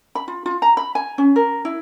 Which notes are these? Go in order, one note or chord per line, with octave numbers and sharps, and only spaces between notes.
B5
F4
F4
A#5
B5
G#5
C#4
A#4
E4